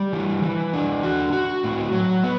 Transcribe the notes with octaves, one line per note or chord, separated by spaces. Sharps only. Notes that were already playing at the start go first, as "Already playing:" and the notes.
Already playing: G3
E3
E3
D4
F#4
F#4
A2
F#3
B3